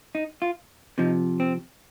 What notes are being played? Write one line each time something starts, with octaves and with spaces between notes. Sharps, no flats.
D#4
F4
C3 F3 D#4
C4